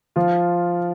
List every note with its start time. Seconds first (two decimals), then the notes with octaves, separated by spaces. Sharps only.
0.16 F3 F4